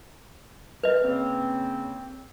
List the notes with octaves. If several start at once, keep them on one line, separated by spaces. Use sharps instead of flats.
B4 D#5
C#3 A#3 C4